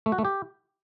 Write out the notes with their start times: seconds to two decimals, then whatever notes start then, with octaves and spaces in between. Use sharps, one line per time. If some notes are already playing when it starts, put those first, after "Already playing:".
0.06 A3
0.12 F#4
0.18 A3
0.25 G4